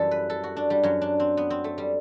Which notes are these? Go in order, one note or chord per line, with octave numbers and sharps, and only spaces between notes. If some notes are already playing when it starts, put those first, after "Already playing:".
Already playing: F#2 E3 G3 G4 A4
B4
A4
F#4
D4
G3
F#2 F#3
D4
C4
B3
C4
A3
G3